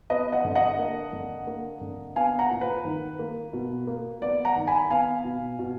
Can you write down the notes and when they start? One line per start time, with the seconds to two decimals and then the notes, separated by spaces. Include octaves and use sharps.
0.10 B3 B4 D#5
0.32 D#5 F#5
0.45 D3
0.55 D#5 F#5
0.79 A#3
1.13 D3
1.47 A#3
1.81 D3
2.16 B3 F5 G#5
2.39 F#5 A#5
2.50 A#2
2.61 B4
2.85 D#3
3.19 A#3
3.53 B2
3.87 A#3
4.22 B3 D5
4.45 F#5 A#5
4.56 D#3
4.67 G#5 B5
4.90 B3 F5 G#5
5.24 B2
5.59 B2